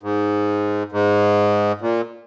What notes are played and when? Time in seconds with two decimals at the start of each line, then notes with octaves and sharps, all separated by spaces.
0.03 G#2
0.92 G#2
1.81 A#2